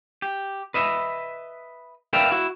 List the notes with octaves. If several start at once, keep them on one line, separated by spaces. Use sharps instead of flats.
G4
B4 D#5 E5
A#4 B4 D5 E5 F5 G5
E4 F#4